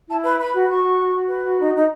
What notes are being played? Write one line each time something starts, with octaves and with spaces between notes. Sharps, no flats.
E4 A5
B4 B5
B4 B5
F#4
F#4 C#6
F#4
F#4
F#4
B4
F#4
D#4
D#4